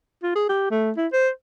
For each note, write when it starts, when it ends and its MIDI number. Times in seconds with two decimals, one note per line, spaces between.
0.23 0.35 65
0.35 0.45 68
0.49 0.68 67
0.71 0.91 57
0.97 1.07 64
1.13 1.29 72